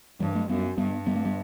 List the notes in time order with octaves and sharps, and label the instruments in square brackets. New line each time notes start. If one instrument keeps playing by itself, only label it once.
[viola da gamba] G2 [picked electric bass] E3 G3
[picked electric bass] F#3 A3
[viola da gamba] F#2 [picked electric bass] G3 B3
[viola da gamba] G2 [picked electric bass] G3 B3
[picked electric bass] G3 B3
A3 C4
G3 B3